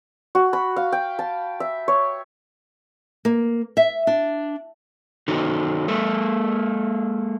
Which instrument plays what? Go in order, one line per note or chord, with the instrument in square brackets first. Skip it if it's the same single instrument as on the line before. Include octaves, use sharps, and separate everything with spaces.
[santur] F#4
B5
F5
G5
A5
E5
C#5
[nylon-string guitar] A#3
E5
D4
[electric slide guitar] D#3 D#4 F#4 A4
G#3 A#3 A4